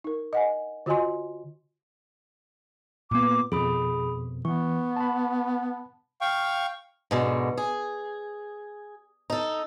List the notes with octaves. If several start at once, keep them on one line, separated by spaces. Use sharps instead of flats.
D#4 A#4
D#5 F#5 G#5
D3 F4 F#4 D#5 G#5 C6
A#2 B3 D6
F2 B2 G#4 B5 D#6
E3 B3 C#6
A5 B5
F5 G5 C#6
G#2 B2 D3
G#4
D#4 A4